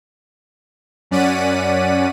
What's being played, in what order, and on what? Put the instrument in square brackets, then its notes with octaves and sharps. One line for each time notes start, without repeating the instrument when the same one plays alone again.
[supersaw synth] F#2 C#4 D5 F#5 B6 D#7